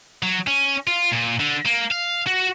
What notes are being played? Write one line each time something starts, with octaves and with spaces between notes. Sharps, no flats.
F#3
C#4
F4
A#2
D3
A#3
F5
F#4